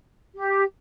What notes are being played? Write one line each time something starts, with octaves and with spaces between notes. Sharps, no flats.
G4